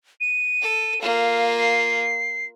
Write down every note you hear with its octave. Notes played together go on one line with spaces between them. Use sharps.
D#7
A4
A#3 F4 F5
C7